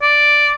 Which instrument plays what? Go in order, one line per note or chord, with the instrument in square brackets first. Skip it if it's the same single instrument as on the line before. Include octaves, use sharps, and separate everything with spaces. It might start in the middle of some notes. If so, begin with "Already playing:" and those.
[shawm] D5